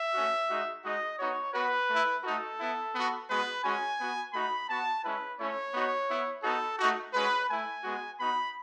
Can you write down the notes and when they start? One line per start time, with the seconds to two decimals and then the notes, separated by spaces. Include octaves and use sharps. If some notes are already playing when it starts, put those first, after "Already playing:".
Already playing: E5
0.13 A3 C#4 F#4
0.49 G#3 D#4 F#4
0.83 G#3 D#4 F#4 D#5
1.18 B3 D#4 F#4 C#5
1.53 B3 F#4 B4
1.88 A3 E4
2.23 A3 D#4 F#4 A4
2.58 B3 E4
2.93 B3 F#4
3.28 G#3 B3 F#4 B4
3.63 G#3 C#4 F#4 G#5
3.98 B3 F#4
4.33 A3 D#4 F#4 B5
4.68 B3 F#4 A5
5.03 G#3 C#4 E4 B4
5.38 A3 C#4 E4 C#5
5.72 B3 D#4 F#4
6.08 B3 E4
6.43 B3 D#4 F#4 A4
6.78 A3 D#4 F#4
7.13 G#3 C#4 F#4 B4
7.48 A3 E4 G#5
7.83 G#3 B3 F#4
8.18 B3 D#4 F#4 B5